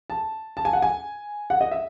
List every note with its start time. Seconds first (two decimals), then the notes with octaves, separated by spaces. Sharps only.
0.10 A5
0.57 A5
0.65 G#5
0.73 F#5
0.82 G#5
1.50 F#5
1.61 D#5
1.71 E5